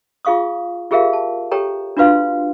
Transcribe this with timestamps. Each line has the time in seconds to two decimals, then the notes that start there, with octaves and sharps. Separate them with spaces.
0.25 F4 G#4 F5 C#6 D#6
0.91 F4 G4 G#4 A#4 E5 F5
1.13 A5
1.51 G4 A4 C#5 G5 A#5
1.97 D4 F4 F#4 B4 F5 C6